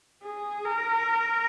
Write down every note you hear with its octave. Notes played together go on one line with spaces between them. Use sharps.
G#4
A#4